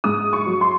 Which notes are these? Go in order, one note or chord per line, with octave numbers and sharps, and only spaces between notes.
G#2 D#6
C#6
F#3
C6